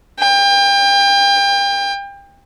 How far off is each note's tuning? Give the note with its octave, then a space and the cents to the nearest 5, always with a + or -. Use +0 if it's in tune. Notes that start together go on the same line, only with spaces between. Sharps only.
G5 +30